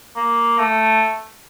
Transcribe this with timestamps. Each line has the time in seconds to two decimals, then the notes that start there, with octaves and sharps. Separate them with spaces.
0.16 A#3
0.59 A3